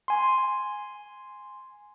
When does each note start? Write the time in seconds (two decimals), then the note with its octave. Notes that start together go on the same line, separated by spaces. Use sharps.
0.08 G#5 C6